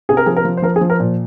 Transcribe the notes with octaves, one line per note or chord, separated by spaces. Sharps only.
C3 G#4
A#4
F3 G#4
A#4
F3
C5
F3 A#4
G#4
F3
A#4
A#2